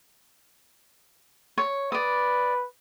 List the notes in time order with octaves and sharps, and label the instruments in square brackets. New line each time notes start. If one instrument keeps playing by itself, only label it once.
[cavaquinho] C#5
[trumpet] B4 [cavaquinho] D5 D#6